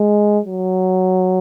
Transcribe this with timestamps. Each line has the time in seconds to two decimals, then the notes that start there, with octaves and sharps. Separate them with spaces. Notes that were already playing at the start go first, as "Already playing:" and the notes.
Already playing: G#3
0.45 F#3